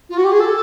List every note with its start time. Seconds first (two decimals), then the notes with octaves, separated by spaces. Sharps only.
0.09 F4
0.17 F#4
0.24 G4
0.31 G#4
0.39 A4